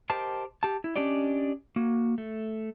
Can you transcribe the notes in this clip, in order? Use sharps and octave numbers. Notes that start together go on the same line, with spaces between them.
G4 A#4 C5 D#5 G5 A5
G4 A5
E4
C#4 D4 G4 D5 D#5
A#3 F#4
A3